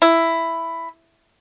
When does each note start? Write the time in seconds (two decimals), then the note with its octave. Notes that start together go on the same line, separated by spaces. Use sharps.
0.02 E4